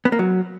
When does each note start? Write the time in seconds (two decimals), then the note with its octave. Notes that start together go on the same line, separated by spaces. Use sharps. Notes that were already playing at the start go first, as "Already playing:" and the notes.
0.05 B3
0.12 A#3
0.19 F#3